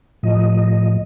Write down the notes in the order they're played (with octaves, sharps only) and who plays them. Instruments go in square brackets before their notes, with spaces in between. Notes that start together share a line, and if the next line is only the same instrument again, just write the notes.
[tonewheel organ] A2 F3 D#5